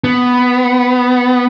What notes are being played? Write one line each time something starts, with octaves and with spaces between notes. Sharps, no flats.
B3